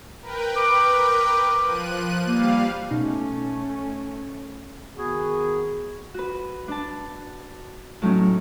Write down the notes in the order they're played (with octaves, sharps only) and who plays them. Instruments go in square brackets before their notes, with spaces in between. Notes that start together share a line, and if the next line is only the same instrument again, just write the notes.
[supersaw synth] A#4 B4 G5
[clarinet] D6
[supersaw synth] F3 F#6 D#7
[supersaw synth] G3 F5 [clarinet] A#3
[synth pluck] B2 D#4 [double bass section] A3 C#4
[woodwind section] D#3 B3 F#4 G#4
[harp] F#4 B4
D4 A5
A2 F#3 A3 C#4 D#4